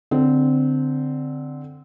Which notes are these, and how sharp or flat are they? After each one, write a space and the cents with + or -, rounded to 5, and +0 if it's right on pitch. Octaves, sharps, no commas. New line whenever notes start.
D3 +0 C4 -15